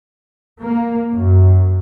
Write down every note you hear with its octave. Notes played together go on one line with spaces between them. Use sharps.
A#3
F#2